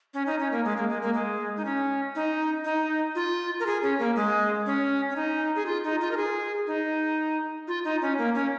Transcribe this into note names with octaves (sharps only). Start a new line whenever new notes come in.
C#4
D#4
C#4
A#3
G#3
A#3
G#3
A#3
G#3
D#4
C#4
D#4
D#4
F4
A#4
G#4
C#4
A#3
G#3
C#4
C#4
D#4
G#4
F4
D#4
F4
A#4
G#4
D#4
F4
D#4
C#4
A#3
C#4